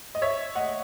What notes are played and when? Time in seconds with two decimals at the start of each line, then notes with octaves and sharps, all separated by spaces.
0.15 D#5
0.22 C#5 E5
0.55 D#5 F#5